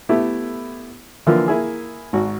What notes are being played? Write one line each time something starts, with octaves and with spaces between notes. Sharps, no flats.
A3 B3 E4 G4 A4
D3 E3 F3 A#3 F4
A#3 E4 G#4
G#1 F#4